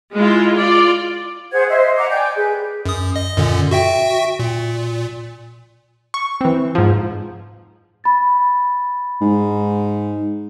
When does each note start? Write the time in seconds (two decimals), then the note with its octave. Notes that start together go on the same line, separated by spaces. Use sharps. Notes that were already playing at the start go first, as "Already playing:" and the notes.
0.14 G#3 E4 F4
0.56 F4 D5
1.52 G#4 C5 F#5 G#6
1.69 C5 D#5 E5
1.97 F#5 A#5 D6
2.10 D5 G5 G#5 G6
2.36 G#4 B4
2.85 F#2 D#6
3.16 D#5
3.37 F#2 A#2 D3
3.71 F#4 E5 G5
4.39 A#2
6.14 C#6
6.41 E3 C4
6.75 G#2 F3
8.04 B5 A6
9.21 G#2